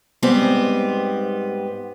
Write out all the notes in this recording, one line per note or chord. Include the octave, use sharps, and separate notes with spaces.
G#2 G3 B3 C4